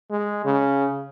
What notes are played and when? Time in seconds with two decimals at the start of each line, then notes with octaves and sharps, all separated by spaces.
0.11 G#3
0.45 C#3